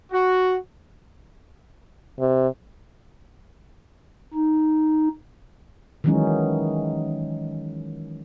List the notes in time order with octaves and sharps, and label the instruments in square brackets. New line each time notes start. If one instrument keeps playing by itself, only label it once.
[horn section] F#4
[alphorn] C3
[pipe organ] D#4
[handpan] D#3 E3 F#3 G#3 C#4 D#4